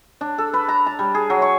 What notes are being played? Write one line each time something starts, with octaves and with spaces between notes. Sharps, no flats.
D4
A4
B4
A#5
A5
G3
G#4
F#3
C#6